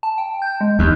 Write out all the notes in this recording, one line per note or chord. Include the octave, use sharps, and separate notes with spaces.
A5
G5
G6
G#3
D#2